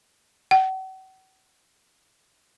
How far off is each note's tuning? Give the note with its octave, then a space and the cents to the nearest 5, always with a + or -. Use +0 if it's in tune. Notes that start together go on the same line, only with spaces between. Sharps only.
F#5 +40